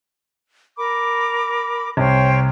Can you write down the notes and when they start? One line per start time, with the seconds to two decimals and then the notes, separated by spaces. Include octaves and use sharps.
0.78 A#4 B5 D6
1.97 C2 C5 C#5 G5